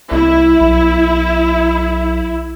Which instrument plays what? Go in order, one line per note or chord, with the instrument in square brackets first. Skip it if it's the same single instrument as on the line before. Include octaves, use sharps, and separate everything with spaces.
[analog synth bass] C2 [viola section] E4
[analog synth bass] B1